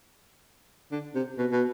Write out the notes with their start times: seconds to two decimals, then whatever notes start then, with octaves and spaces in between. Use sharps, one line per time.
0.91 D3
1.15 C3
1.38 B2
1.52 B2